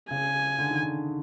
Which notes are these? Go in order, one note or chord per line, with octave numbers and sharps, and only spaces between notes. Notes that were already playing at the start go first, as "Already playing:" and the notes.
C#3 G#5
D3
D#3
D3